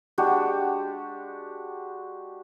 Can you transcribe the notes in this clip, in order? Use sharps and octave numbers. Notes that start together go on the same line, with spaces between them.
G#3 D4 F#4 G4